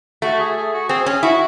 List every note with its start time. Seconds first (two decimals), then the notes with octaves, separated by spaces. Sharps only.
0.22 A3 F#4
0.40 G#4
0.56 G#4
0.73 F#4
0.89 C4 G#4
1.06 C#4 G#4
1.23 E4 F#4